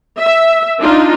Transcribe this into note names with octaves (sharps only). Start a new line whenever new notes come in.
E5
D4 D#4 F4